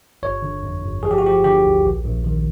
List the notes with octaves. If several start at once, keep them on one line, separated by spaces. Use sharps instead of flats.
G1 C#5
D3
F2
G1
F3 G#4
G4
F#4
F3 G4
D3 G4
D2
A#1
A#1
D#3